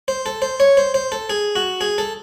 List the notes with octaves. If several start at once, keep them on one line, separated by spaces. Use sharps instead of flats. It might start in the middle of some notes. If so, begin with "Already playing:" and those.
C5
A4
C5
C#5
C5
C5
A4
G#4
F#4
G#4
A4